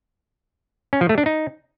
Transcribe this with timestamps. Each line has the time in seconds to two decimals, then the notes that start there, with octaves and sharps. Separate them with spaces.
0.93 C#4
1.01 F3
1.09 A3
1.18 D4
1.26 D#4